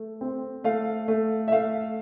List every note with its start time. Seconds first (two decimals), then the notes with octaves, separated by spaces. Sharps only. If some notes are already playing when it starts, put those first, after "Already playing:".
Already playing: A3
0.21 C4
0.64 A3 F5
1.08 A3
1.48 E5
1.52 A3 F5